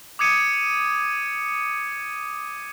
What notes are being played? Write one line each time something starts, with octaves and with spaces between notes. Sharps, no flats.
D6 D#6 G#6 C#7 D#7